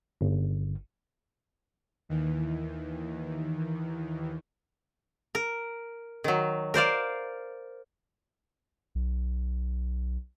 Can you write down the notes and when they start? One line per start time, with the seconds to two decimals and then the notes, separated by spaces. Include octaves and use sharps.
0.21 G1
2.09 D#2 D#3 E3
5.35 A#4
6.24 D#3 F#3
6.74 A#4 C5 D5 F5
8.95 B1